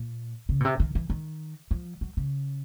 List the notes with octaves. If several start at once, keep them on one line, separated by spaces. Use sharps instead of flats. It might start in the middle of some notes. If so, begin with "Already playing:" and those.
Already playing: A#2
C#3
B2
C3
D#3
E3
D#3
F3
F#3
C#3